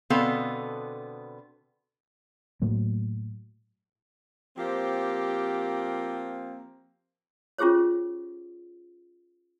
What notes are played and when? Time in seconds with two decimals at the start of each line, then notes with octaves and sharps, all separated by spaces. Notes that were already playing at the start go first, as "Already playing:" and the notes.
0.10 B2 D3 B3 C4 A4 F5
2.62 A2 F#3 A#3
4.57 F3 A#3 C4 G4
7.58 C#4 F4 G4 G#4 C5 C#5